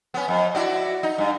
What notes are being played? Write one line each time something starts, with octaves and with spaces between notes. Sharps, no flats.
B3 C#4
F2
E4 F#4 D5
D#4
G2